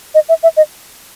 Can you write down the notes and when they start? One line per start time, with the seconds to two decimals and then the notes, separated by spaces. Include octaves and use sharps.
0.15 D#5
0.29 E5
0.43 E5
0.57 D#5